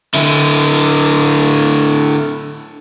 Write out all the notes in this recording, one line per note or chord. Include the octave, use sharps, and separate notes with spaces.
D3 E4